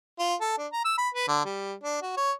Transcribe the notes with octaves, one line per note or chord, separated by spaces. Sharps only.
F4
A4
D4
A#5
E6
B5
B4
D3
G3
D4
F#4
C#5